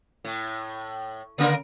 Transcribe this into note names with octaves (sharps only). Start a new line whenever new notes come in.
A2
C#3 A#3 A#4